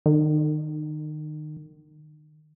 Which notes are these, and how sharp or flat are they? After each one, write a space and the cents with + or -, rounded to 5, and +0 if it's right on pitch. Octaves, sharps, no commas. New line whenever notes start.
D#3 -30